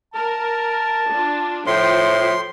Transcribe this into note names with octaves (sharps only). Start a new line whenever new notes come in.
A#4 A5
D4 F4
A2 F3 C5 G5 C6